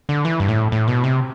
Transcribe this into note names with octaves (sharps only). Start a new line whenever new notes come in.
D3
E3
G2
A2
A2
B2
C3